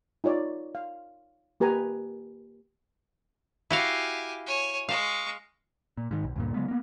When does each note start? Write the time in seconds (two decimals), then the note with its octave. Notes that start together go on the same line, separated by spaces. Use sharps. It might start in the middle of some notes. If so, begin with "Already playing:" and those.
0.24 D#4 F4 C#5 D5
0.75 F5
1.60 A#3 G4 B4 G#5 A#5
3.71 E4 F#4 G4 F5 G#5
4.47 C#5 G#5
4.89 G#3 F5 C#6
5.97 A#2
6.11 G#2 D#3
6.24 B1
6.36 D2 G2 A#2
6.54 C#3 F#3 G#3 B3
6.68 A#3 B3